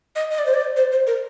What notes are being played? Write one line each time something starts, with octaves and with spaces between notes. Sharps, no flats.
D#5
D#5
D5
C5
D5
C5
C5
A#4